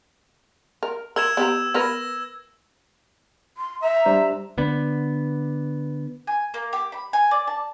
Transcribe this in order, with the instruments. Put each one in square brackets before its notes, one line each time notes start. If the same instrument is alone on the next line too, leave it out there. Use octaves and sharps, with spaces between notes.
[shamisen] A#4
[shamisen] A#4 [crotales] E6 G#6 E7
[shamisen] B3 G4 A#5
[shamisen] B3 A#4 B4 [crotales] G#6 A#6
[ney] C6
[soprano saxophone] E5 [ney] A#5
[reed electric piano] G3 D4 C5
[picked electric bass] D3 B3
[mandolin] G#5
A#3
G4
B5
G#5
D5
A5